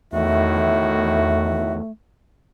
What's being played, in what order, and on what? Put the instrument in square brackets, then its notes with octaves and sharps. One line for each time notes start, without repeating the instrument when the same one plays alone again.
[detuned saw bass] E2 [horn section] A2 D#3 F#4 [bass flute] A3 [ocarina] E5